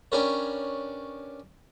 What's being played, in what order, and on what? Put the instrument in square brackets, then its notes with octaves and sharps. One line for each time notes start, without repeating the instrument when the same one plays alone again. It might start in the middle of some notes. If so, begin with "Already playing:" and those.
[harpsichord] C#4 D4 G4 A#4 B4 C#5